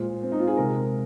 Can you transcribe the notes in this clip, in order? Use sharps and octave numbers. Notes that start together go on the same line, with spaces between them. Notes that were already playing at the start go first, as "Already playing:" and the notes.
Already playing: A#2 G#3 C5
C4
D#4
F4
G#4
C3 G#3 A#4